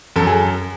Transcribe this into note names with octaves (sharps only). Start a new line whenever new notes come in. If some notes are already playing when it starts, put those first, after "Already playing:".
F#2 A4
G#4